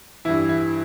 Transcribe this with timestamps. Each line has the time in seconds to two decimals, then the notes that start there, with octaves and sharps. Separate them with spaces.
0.25 G2 E3 E4
0.49 E4